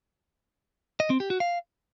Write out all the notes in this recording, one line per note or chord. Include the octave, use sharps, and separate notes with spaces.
D#5
C4
G4
F#4
F5